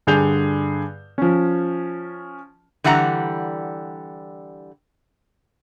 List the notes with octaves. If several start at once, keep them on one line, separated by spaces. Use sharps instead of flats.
G2 D3 G#4 G6 F7
F3 C#4
D3 E3 G3 F#5 A#5